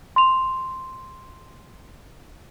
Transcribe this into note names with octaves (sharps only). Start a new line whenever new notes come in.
C6 F7